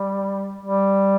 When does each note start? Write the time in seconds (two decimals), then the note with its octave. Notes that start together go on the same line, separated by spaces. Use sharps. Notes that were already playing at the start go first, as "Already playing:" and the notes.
Already playing: G3
0.65 G3